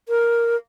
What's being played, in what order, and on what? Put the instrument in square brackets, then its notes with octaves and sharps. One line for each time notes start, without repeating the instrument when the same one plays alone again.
[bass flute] A#4